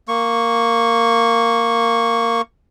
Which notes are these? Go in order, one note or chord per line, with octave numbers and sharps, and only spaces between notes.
A#3 C#6